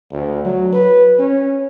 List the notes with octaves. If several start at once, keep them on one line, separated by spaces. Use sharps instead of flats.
D2
F#3
B4
C#4